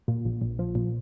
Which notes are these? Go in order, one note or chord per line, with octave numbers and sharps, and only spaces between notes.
A#2
A#1
A#1
F3
A#2